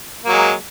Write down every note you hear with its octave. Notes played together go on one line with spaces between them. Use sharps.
F#3 G#3 A#3